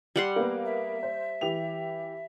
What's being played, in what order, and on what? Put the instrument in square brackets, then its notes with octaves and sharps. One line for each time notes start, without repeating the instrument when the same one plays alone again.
[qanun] G3 F#5 C6
[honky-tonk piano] A#3 B3
[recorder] E5
[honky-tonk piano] C5
E3 G4 F7